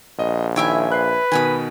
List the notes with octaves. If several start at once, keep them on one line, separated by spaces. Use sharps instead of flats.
A#1 D#5
D#3 E4 C#5 E5 G5 G#5 D7
B4 F#6 C7
B2 D#3 G#5 B5 D#6